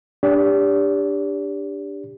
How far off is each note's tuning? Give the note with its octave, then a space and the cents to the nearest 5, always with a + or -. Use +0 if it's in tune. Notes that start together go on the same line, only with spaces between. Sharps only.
D4 +0 G4 +20 D5 -40